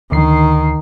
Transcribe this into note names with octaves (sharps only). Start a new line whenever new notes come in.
D2 D3 D#3 C7